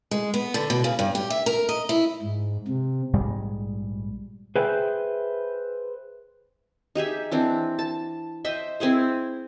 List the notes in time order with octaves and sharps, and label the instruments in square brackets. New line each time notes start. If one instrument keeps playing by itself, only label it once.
[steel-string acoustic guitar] G#3
B3
D3
B2
C#3
G2
G4
E5
A#4
D#5
E4
[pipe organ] G#2
C3
[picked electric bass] A#1 G#2 G3 G#3
[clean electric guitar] G#4 B4 C5 E5 G5
[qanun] D#4 G4 G#4 E5
E3 C4 D4
A5
C5 D#5 E5 G5
C4 E4 G#4 C5